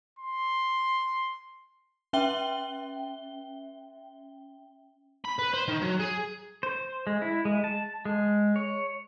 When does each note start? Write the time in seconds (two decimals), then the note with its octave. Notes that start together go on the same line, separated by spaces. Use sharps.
0.19 C6
2.13 C#4 E5 G5 G7
5.25 B5
5.39 B4
5.53 C5
5.68 D#3
5.82 F#3
6.00 G#4
6.63 C5
7.07 G#3
7.22 E4
7.45 G#3
7.64 A5
8.05 G#3
8.56 C#5